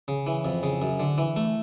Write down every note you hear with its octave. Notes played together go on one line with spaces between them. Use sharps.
C#3
E3
F2
C#3
F#2
D3
E3
A3